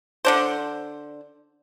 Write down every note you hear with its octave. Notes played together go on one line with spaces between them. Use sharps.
D3 D4 C5